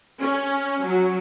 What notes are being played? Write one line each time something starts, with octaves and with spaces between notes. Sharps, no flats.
C#4
F#3